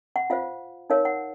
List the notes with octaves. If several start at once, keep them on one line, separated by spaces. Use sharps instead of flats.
F#5
F4 C5 F5
D#4 A#4 C#5 F5
F#5